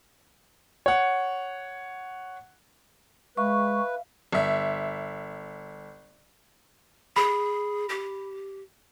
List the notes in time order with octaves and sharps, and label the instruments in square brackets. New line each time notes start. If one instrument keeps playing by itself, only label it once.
[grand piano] C#5 F#5
[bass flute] G#3 [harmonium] B4 [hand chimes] E5 F5 [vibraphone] C#6
[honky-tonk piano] G1 E5
[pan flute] G#4 [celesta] B5
[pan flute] G4